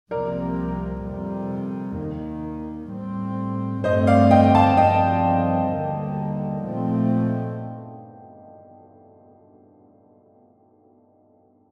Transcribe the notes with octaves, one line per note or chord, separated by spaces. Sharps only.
C2 C3 F3 A#3 A#4 D5
F2 C3 G3
D#2 D#3 A#3
A2 G3 C4
G2 D3 A3 C4 C5 D#5
D5 F5
D#5 G5
F5 A5
G2 F3 C4 D#5 G5
D#2 D3 G3 A#3
A#2 F3 A3 C4